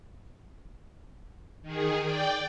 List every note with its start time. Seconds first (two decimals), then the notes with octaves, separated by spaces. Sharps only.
1.62 D#3 G#4
2.03 D5 G5